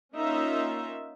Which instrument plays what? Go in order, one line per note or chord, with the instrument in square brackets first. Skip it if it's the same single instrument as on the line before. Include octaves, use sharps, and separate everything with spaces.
[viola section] A#3 C#4 D#4 F4 E5